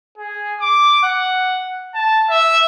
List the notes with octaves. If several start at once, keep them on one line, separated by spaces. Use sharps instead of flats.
G#4
D6
F#5
A5
E5